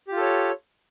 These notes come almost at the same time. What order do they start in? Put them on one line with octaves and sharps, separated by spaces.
G4 F4 A4 C#5